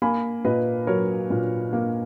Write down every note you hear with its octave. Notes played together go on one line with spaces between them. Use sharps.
A#3 G#5 B5
A#2 B4 D#5
F#3 A#4 C#5
A#2
A#3